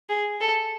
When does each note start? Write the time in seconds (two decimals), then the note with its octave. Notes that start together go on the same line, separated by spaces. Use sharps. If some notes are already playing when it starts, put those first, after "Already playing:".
0.10 G#4
0.41 A4